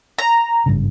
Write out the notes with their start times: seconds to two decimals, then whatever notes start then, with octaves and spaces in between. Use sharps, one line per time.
0.19 A#5
0.66 G#1 G2 C#3